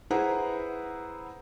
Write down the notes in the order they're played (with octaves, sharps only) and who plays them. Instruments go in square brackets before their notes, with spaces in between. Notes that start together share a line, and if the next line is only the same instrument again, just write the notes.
[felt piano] E4 G#4 B4 C5 F#5 A#5